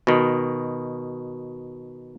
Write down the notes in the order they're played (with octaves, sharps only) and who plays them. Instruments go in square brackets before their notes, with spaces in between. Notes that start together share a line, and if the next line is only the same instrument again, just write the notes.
[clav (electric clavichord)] B2 D#3